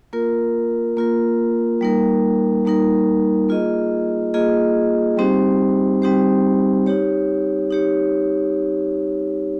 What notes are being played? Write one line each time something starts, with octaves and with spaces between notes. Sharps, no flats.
A#3 F4 A#4
A#3 F4 A#4
G3 A#3 D#4 A#4
G3 A#3 D#4 A#4
A#3 F4 G#4 D#5
A#3 F4 G#4 D#5
G3 C4 D#4 G4 C5
G3 C4 D#4 G4 C5
D#4 G4 C#5
D#4 G4 C#5